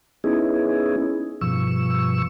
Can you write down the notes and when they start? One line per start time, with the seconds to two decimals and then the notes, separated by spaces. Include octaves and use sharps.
0.24 B3 C#4 D#4 E4 G#4
1.41 G2 B2 F3 C#6 E6